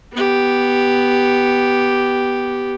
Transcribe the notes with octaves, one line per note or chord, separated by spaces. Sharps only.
B3 G4